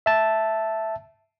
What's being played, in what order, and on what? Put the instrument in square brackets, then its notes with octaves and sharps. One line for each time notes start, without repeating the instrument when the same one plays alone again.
[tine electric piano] E5 A5